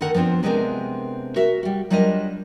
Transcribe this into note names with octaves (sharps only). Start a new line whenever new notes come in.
D3 D#3 A4 A#4 F#5
F3 B3 C4 D4 F4
C3 G#3 B3 C4 D4 A#4
F#4 A#4 E5
G3 F#4
F#3 G3 D4 F4 A#4 D#5